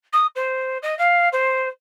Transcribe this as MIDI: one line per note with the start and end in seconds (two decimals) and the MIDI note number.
0.13 0.26 87
0.35 0.78 72
0.82 0.97 75
0.98 1.29 77
1.32 1.68 72